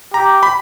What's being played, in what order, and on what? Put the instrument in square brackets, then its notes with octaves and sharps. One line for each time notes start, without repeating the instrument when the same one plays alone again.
[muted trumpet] G4 [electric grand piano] A#5
[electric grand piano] B5